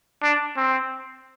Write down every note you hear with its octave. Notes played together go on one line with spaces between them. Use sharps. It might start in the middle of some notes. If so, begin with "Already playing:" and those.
D4
C4